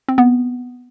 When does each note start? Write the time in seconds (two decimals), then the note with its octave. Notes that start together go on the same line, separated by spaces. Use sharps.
0.08 C4
0.18 B3